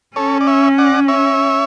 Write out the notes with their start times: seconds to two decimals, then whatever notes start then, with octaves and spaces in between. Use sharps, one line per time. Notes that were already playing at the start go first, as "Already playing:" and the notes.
0.16 C#4 A4 C#5
0.41 D5
0.47 C#5 E5
0.78 D5 F#5
1.08 C#5 E5